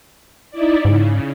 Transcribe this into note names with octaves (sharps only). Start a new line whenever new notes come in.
D#4 E4 D5
G#2 C#3